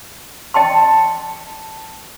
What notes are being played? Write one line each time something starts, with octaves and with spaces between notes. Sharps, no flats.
D#5 G5 A5 C6